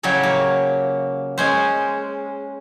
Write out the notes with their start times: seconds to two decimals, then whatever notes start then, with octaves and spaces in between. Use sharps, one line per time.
0.03 A2 C#3 F#3 G4 C#5 E5
0.23 A#3
1.38 G#3 C#4 C5